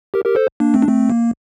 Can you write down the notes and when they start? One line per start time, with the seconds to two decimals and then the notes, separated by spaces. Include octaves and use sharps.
0.14 G4 A#4
0.25 G4 A#4
0.35 A4 C5
0.60 A#3 D4
0.74 A3 C4
0.82 D4
0.88 A3 C4
1.10 A#3